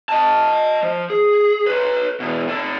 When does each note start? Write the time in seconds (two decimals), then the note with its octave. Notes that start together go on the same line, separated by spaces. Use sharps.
0.09 D#5 A5
0.83 F3
1.10 G#4
1.67 B4 C#5
2.20 B2 E3
2.48 C3 A4